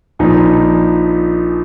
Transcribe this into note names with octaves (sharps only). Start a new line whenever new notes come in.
A#1 A#2 F3 D#4